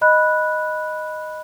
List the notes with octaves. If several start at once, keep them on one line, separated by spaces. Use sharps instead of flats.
D#5 B5 F#6